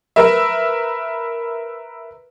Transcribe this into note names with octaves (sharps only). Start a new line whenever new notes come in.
A#4 B4 E5